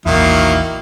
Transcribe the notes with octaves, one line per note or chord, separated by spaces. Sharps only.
A#1 E2 D#3 F#3 A#3 E4